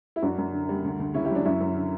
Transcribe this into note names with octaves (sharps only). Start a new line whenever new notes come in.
E4
F#2 D4 F#4
F#2
D3
G3
D2
D2
C#3 C#4 E4
E4 G4
F#3 D4
F#2 C#4 E4
F#2
D3